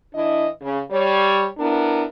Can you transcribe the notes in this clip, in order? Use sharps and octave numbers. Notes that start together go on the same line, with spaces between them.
E3 D4 E4 D#5
C#3
G3 C#5
B3 D4 E4 A#4